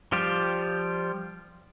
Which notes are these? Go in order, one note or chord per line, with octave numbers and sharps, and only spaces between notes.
F3 G3 F4 G4